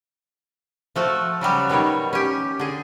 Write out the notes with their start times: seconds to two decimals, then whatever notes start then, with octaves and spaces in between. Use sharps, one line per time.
0.96 F3 A3 F#4
1.41 C#3 F#3 G3 F#4
1.69 B2 D#3 G3 C#5
2.13 C#4 G4
2.60 D3 G#4